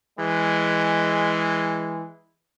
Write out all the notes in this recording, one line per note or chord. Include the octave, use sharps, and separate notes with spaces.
E3 G#3